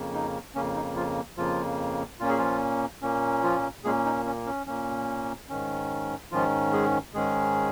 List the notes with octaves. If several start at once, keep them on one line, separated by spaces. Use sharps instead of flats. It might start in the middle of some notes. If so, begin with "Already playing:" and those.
Already playing: F2 C#3 A#3
D#4
F2 C#3 A#3 C#4
D#4
F3 F4
F2 C#3 F3 A#3 F4
A#2 A#3 C#4 F4
G#4
F3 F4
A#2 A#3 C#4
F3 F4
A#2 G#3 A#3 C#4 G#4
D#4
C#4
C#4
A#2 A#3 C#4
G#2 D#3 C#4
G#2 D#3 F3 C#4 F4
G#3 G#4
G#2 D#3 G#3 C#4 G#4